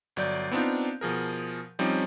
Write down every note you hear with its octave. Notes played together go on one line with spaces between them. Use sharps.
G1 F#3 D5 G6
B3 C4 D4 D#4 F4
B2 F3 G#4 A#4
F3 G3 C4 C#4 D#4